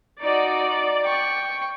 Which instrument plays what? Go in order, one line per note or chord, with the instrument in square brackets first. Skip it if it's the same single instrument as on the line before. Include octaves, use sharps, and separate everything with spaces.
[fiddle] D#4 F#4 [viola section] D5
[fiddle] G5 C#6